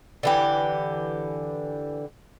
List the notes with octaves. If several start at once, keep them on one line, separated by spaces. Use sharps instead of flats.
D3 E3 G4